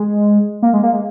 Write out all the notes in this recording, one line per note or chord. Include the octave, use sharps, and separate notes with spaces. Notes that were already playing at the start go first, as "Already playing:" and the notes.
Already playing: G#3
A#3
G#3
A#3
G#3